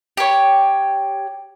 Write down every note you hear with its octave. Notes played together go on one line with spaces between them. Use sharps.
G4 C#5